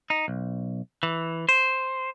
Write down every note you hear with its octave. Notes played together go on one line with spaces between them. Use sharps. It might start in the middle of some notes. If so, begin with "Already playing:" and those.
D#4
B1
E3
C5